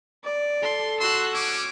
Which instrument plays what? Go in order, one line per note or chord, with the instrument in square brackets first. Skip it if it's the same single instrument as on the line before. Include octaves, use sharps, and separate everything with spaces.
[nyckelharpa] D5
[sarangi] A4 [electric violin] C6
[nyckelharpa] F#4 [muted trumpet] C6 [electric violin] E6 F#6
[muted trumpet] C#4 [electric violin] D6